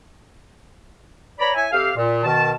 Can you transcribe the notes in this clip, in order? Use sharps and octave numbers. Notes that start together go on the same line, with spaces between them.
B4 C#5 D5 A#5 B5
E4 C#5 E5 G#5
C3 G4 A4 F5
A#2
B2 D#3 A5